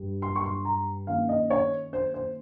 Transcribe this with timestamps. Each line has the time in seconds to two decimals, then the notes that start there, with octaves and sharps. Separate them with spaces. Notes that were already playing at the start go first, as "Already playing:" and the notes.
Already playing: G2 G3
0.22 C6
0.36 C#6
0.44 C6
0.65 A#5
1.07 D#3 A#3 C#4 F5
1.29 D#5
1.50 C#5
1.93 C5
2.14 C5